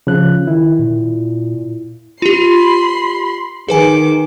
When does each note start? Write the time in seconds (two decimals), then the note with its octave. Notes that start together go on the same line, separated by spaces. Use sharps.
0.07 C#3 F3 F#6
0.47 D#3 E4
0.79 A#2
2.22 F4 G4 B5 C6
3.69 D#3 G#4 B4 G#5 D6